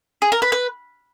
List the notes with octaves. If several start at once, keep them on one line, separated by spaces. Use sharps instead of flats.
G#4
A#4
B4
B4